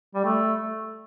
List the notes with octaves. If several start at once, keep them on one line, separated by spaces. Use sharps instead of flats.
G3
A3